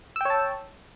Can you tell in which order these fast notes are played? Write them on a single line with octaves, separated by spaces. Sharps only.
E6 G5 C#5 A5